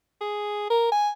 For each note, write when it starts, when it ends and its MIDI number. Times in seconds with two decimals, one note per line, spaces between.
0.21 0.65 68
0.70 0.88 70
0.92 1.10 80